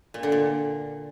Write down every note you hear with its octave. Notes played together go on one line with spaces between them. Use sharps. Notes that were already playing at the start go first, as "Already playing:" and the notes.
A#2
D3
A#2